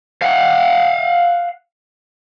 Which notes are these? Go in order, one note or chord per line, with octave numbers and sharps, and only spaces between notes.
F5 F#5